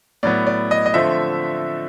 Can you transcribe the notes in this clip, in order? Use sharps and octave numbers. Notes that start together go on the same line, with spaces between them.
A2 F#3 B3 D5
D5
D#5
D#5
D3 F3 A3 C4 E5